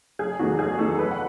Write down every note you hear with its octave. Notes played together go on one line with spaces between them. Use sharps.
F#1 G#4
E2 D#3 A3 F#4
F#1 G#4
E2 D#3 A3 A4
F#1 B4
F#5